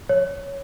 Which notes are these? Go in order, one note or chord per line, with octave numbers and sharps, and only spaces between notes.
C#5